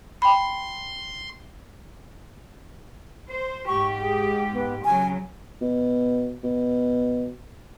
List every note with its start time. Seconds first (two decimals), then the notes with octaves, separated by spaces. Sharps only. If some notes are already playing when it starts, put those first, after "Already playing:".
0.22 G5 B5 C6
3.29 C5
3.67 G#2 G4 C#6
4.00 G#4
4.52 B3
4.85 C#3 F#3 G#5
5.61 B2
6.44 B2